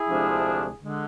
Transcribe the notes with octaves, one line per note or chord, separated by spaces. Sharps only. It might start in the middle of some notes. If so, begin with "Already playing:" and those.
Already playing: E4 G#4
D2 C3 F3 G#3 D4
D3 G#3